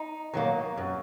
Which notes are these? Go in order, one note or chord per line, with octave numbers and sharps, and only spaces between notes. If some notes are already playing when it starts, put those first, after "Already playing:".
Already playing: D#4
D#3 F#3 A#3
F#2